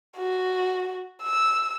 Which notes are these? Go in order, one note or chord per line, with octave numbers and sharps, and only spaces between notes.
F#4
E6